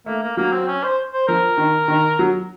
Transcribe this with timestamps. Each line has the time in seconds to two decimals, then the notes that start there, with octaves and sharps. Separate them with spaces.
0.06 A3 A#3
0.22 A#3
0.37 F#3 A#3
0.52 C4
0.67 C#4
0.83 C5
1.13 C5
1.27 F3 A#4
1.58 D#3
1.88 D#3
2.19 F#3